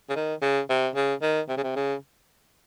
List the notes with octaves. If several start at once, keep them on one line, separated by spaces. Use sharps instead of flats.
C#3
D#3
C#3
C3
C#3
D#3
C3
C#3
C3
C#3